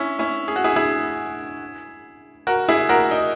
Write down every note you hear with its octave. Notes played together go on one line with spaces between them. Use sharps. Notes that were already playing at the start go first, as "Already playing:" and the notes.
Already playing: C#4 E4
C#4 E4
G#4
F#4
E4 G#4
E4 G#4
F#4 A#4
E4 G#4
F#4 A#4
D#4